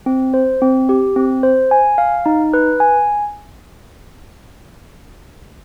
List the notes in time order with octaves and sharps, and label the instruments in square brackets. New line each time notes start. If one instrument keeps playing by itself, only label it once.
[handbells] C4
C5
C4
G4
C4
C5
G#5
F5
D#4
B4
G#5